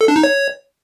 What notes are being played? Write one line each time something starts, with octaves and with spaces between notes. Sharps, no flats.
A4
D4
D#4
C#5